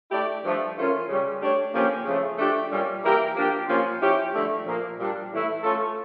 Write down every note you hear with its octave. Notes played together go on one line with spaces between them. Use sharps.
A3 E4 G4 D5
G2 F3 A3
E3 A3 C#4 F4 A#4
C#3 G3 C#4
A3 D4 G4 C#5
D3 F3 A#3 C#4 G4
C#3 F3 A3
F3 A3 D4 G4 D5
A#2 G3 C#4
E3 A#3 E4 G4 A#4
F3 A#3 D4 G4
A#2 F3 A#3 C#4 F4
F3 C#4 E4 G4
G2 D3 F3 A3
A#2 F3 A#3
A#2 G3 D4
A2 E3 A3 E4
A3 C#4 F4 A4